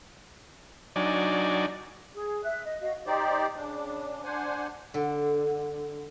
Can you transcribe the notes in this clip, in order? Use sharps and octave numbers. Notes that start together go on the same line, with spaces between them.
F#3 D4 D#4 D5 G#5
G#4
E5 F#6
D#5
F#4 D#5 F5
D#4 G4 C5 D5
C#3 D4
D4 C5 F#5 G#5
D3